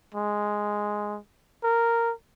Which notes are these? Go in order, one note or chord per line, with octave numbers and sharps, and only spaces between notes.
G#3
A#4